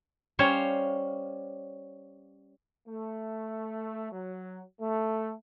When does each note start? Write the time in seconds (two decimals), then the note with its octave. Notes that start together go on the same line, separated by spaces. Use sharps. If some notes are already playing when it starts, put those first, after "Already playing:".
0.39 G3 C#4 C5 C#5 F5
2.88 A3
4.12 F#3
4.81 A3